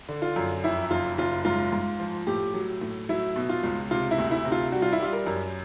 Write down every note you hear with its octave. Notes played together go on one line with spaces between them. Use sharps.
D3
F4
F#2
F2 E4
F#1 F4
F#1 F4
G#2 F4
G#2
F3
A2 G4
F#3
A2
F#3 E4
B2
F4
C#2
C3 F4
E4
D2
E4
C3
F4
G3 F#4
F4
E4
G3 F4
A#4
F#2